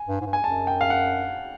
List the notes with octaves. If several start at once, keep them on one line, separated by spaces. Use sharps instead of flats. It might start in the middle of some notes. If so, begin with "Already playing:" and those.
Already playing: G#5
G2
G#2
G2
G#5
F#2 A5
G5
F5
F#5